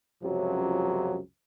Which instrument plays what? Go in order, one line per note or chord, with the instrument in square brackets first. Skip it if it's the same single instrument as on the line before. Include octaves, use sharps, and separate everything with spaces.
[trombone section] C#2 F#2 C3 F3 F#3